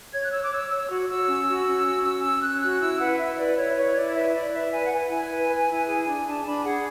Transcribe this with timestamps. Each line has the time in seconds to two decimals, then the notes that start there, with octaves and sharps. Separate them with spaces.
0.12 C#5 G#6
0.22 F#6
0.31 C#5 E6
0.41 D6
0.51 C#5 E6
0.69 C#5 E6
0.88 F#4
1.08 F#4 E6
1.27 C#4
1.47 F#4
1.66 C#4
1.85 F#4
2.03 C#4 E6
2.22 C#4 E6
2.41 C#4 F#6
2.61 F#4 F#6
2.80 E4 E6
2.99 B4 F#5
3.18 E4 E5
3.37 B4 D5
3.56 E4 C#5
3.76 B4 C#5
3.96 E4 D5
4.15 B4 E5
4.33 E4 D5
4.52 B4 E5
4.72 B4 G#5
4.84 F#5
4.92 B4 G#5
5.10 E4 G#5
5.30 B4
5.48 B4
5.68 E4
5.87 G#4
6.06 D4
6.25 D4 A5
6.44 D4 B5
6.63 G#4 F#5